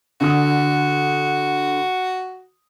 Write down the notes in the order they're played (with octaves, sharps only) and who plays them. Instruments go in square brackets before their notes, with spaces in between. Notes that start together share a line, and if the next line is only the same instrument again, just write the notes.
[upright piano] D3 A4 D#6 [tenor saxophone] F#4